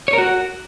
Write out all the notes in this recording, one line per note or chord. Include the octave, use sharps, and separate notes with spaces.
C#5
A#4
F#4